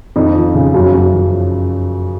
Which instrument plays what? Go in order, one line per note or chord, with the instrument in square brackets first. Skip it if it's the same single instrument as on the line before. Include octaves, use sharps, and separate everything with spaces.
[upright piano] F2 D#4
F3
C#3
F#2
F#2
F3